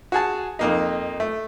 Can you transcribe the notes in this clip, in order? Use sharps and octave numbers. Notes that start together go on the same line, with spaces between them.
F#4 G#4 A5
F2 A#3 D#4
A3